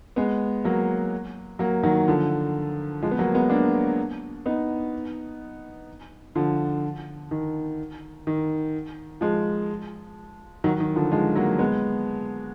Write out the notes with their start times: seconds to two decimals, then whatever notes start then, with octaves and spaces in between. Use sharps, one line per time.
0.16 G#3 B3
0.64 F#3 A#3
1.59 F#3 A#3
1.83 D#3 F#3
2.08 D3 F3
3.02 F3 G#3
3.11 B3
3.19 F#3 A#3
3.34 G#3 B3
3.50 A#3 D4
4.46 B3 D#4
6.35 D3 F3
7.31 D#3
8.27 D#3
9.21 F3 G#3
10.64 D#3 F#3
10.80 D#3
10.96 D3 F3
11.12 F3 G#3
11.36 F#3 A#3
11.59 G#3 B3